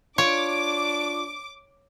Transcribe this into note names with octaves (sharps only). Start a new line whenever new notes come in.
D4 F4 C#5 C#6 D6